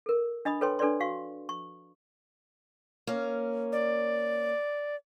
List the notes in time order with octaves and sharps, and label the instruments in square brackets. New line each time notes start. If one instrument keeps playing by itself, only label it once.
[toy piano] A4 A#4
D4 D#5 B5 D#6
A4 B4 C#5 G5 C6
D4 A4 B4 C#5 D5 C6
F#4 F5 C#6
C#6
[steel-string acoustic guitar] A#3 C#4
[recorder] D5